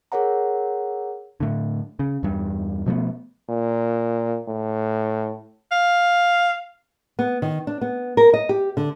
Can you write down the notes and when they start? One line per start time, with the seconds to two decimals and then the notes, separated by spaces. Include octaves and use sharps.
0.12 G#4 A#4 C#5 F#5 A#5
1.40 A2 D3
1.99 C#3
2.23 E2 G2
2.86 B2 F3 A3 B3
3.49 A#2
4.48 A2
5.72 F5
7.19 B3
7.42 D#3
7.67 D4
7.81 B3
8.17 A#4
8.34 D#5
8.49 G4
8.77 D3